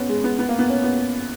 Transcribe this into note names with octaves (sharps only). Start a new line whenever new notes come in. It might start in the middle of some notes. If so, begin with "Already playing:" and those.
Already playing: B3 C#4
G#3
B3
B3
A#3
B3
C#4
B3